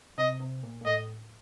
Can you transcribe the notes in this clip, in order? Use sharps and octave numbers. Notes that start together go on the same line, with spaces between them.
C3 D#5
C3
A#2
A#2
A2 D#5